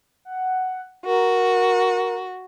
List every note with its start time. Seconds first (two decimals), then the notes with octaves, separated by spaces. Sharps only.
0.25 F#5
1.06 F#4 A#4